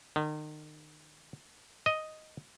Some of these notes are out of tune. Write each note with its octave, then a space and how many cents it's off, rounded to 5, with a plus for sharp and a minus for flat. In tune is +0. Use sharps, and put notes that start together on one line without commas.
D#3 -35
D#5 +0